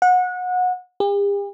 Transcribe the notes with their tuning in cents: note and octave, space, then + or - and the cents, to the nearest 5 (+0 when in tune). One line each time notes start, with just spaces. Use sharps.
F#5 -25
G4 +45